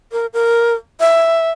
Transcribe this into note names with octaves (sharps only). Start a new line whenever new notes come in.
A#4
A#4
E5